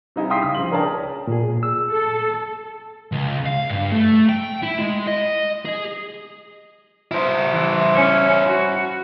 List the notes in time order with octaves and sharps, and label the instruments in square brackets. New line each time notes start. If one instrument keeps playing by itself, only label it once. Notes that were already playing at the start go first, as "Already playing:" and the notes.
[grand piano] C3 G3 D#4 E4 G#4
F5 G5 C6 D#6 B6 C7
C#3 D#6
F3 F#7
D4 G#4 A#4 C#5 G5 A5
[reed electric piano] A#2 G#4
E6
[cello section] A4
[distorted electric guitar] C#2
F5
G2
A3
G5
E4
G#3
D#5
G#4
[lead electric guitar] E4 C5
[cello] E3
C#4 C#5
F#4